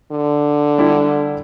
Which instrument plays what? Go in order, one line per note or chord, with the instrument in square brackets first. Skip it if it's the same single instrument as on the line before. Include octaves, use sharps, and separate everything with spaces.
[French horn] D3
[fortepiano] G3 D4 E4